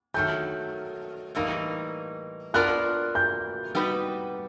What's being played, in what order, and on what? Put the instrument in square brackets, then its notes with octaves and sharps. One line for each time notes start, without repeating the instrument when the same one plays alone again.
[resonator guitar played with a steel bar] D#3 F#3 A3 [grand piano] G6
[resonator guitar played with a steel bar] A2 E3 G3 A#3 D#4
[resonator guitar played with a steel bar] B3 D4 F4 A#4 D5 [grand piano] F#6
[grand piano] G6
[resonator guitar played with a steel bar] G3 B3 D#4 F#4 B4